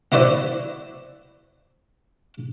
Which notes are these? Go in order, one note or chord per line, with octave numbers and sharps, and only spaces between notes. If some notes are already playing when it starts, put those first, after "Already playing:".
B3 E4 F#4 C5 D5 E5